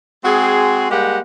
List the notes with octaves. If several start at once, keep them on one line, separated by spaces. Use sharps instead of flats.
G#3 C4 F#4 G#4
G3 G#3 A#3 G4 F#5 G5